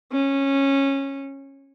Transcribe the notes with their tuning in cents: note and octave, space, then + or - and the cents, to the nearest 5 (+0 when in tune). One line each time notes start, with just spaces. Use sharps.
C#4 -15